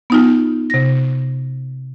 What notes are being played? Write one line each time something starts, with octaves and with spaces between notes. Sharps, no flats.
B3 D#4 F4
C3 A#6